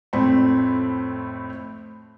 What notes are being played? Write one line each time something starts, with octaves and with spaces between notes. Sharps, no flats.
F2 A2 A3 C4 B5 C6